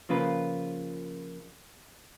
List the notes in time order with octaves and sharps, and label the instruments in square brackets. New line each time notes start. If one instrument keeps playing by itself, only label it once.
[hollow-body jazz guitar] C#3 F3 A#3 F4 B4